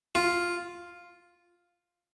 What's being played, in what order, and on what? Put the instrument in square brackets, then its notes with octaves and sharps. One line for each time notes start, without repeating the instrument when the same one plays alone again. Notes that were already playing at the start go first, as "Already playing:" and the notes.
[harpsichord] F4